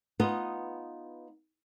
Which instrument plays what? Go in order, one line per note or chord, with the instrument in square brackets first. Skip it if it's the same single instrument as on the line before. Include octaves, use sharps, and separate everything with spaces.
[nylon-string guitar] B3 D#4 F4